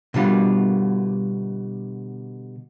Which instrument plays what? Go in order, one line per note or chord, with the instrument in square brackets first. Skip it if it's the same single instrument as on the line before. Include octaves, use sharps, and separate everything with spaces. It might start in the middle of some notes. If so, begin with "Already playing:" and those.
[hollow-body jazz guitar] B2 D3 G3 F4